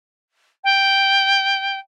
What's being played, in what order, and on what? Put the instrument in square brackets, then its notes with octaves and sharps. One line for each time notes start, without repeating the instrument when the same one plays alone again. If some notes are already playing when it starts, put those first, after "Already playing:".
[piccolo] G5